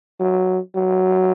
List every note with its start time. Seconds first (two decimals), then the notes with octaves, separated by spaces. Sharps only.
0.20 F#3
0.75 F#3